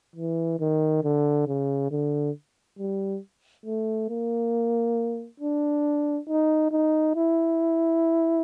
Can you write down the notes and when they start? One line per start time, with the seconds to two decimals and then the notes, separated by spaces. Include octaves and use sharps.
0.16 E3
0.60 D#3
1.04 D3
1.48 C#3
1.92 D3
2.79 G3
3.66 A3
4.10 A#3
5.40 D4
6.29 D#4
6.72 D#4
7.16 E4